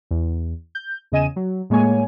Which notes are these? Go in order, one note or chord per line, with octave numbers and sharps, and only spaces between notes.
E2
G6
E2 C#3 D#5 G#5 D#7 E7
F#3
A2 G#3 A#3 C#5 G#5